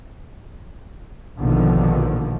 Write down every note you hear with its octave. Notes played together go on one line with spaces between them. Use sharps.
A#1 B2 D3 D#3 F3